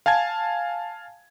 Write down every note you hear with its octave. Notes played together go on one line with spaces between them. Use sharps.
F5 G#5 A5 G#6